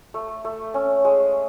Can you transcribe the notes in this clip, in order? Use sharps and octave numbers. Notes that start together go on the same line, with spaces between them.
A3
A3
C#4
G#3